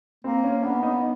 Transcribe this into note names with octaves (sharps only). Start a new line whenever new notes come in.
A#3 C4
C#4
B3 D4
D#4